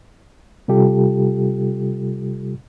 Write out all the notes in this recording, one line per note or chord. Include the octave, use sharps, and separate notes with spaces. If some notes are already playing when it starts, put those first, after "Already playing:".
C3 G3 F4 G4 A4